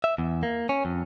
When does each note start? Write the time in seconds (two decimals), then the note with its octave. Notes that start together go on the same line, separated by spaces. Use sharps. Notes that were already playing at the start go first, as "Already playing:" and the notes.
0.04 E5
0.18 E2
0.43 A#3
0.69 C#4
0.85 F2